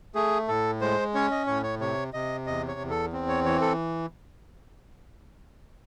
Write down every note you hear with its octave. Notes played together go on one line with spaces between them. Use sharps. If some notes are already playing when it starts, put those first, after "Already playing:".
A3 G#4
A2 A4
G#3 C5
C#4 C#5
D#5
A2 C#5
C#5
C3 C#5
C3 D#5
E2 D#5
C#5
E2
A4
C4
C#5
E3 C#5
A4